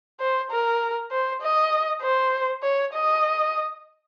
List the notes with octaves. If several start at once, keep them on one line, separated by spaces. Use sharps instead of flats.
C5
A#4
C5
D#5
C5
C#5
D#5